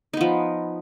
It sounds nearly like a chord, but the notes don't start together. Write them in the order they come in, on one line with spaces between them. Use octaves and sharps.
D#4 B3 F3